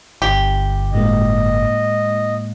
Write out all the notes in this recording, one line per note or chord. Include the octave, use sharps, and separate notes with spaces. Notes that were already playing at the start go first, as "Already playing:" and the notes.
G1 G4
A2 G#3 A#3 D#5